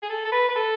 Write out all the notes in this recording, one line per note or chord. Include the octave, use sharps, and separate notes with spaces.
G#4
A4
A4
B4
B4
A4